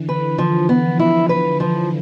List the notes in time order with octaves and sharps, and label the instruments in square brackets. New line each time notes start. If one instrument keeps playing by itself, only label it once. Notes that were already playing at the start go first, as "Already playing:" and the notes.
Already playing: [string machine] D3 E3
[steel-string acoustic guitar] B4
[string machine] E3 [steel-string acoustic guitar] F3
[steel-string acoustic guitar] B3
[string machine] D3 F3
[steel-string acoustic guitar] E4
B4
F3